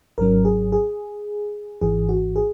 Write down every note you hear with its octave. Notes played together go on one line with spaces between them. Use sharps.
G#1 G#2 F#3 C#4 A#4
G#4
G#4
G#1 G#2 E3 G#4
F#4
G#4